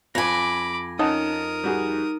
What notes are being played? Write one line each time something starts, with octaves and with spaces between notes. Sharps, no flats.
F2 G#5 B5 D6 A#6
C#4 D#4 A#4 F#5 A5 D#6
G3 F#4 G#4